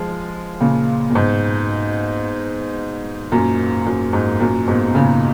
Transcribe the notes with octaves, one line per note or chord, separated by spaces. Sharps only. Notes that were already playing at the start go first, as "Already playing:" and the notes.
Already playing: F3 G#3
A#2 C#3
A#2
G#2 B2
F#2 A#2
F#2
G#2
F#2 A#2
G#2 B2
B2
A#2 C#3